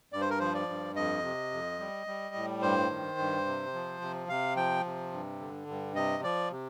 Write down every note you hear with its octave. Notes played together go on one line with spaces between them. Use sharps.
G2 D5
C5
A#4
F3 C5
D5
G2
F2 D#5
C3
F2
G3
G3
A2
G2 C5
D#3
G2
C3
F3
C3
C3 F5
F3 G5
C3
G2
D3
G2
C3 D#5
F3 D5
C3